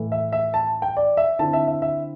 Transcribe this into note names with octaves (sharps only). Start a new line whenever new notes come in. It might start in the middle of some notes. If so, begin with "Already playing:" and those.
Already playing: A2 E3 A3
E5
E5
A5
G5
D5
E5
D3 C4 E4 A5
E5
E5
E5